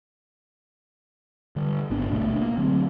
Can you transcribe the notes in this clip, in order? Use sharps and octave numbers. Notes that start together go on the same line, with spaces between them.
D3 G3
G#1 B3 D4
D1 B2 A3 D4
A#3
D3 F#3 C4